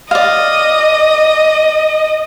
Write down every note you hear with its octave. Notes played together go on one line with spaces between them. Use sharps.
D5 D#5 F5